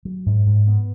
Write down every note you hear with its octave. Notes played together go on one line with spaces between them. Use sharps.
F#3
G#2
G#2
B3